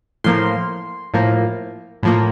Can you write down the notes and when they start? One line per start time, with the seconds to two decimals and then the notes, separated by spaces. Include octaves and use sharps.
0.24 A2 F3 A#3 C6
1.14 A2 F3 A#3
2.03 A2 F3 A#3